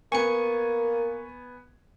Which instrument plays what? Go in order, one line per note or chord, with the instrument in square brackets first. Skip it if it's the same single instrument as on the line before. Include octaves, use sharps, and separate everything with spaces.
[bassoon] A#3 [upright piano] B3 G#5 [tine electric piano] C#6 C#7